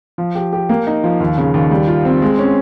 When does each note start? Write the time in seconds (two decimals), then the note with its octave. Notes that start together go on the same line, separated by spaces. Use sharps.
0.18 F3
0.35 G4
0.53 G4
0.69 A#3
0.87 D#4
1.04 F3
1.20 D#2
1.38 C#3
1.54 D#2
1.71 G3
1.88 F4
2.05 C4
2.22 G#3
2.39 C#4